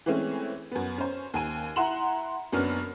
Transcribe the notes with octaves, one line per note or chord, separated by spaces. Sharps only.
E3 G#3 A3 C4 C#4
F#2 B3
C#4 C5
D#2 G#5 D#7
E4 F#5 A#5 C6 E7 F#7
F#1 F#2 B3 C#4 D4 F6